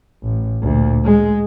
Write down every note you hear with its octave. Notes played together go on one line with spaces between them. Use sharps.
A1
D2 A#2
G#3